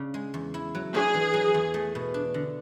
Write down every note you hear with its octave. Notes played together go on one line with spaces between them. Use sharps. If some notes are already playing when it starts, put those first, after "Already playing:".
Already playing: C#3 D4
G#3
E2
E4
F#3
D4 G#4
E3
F#3
E2
A3
B2
D4
D3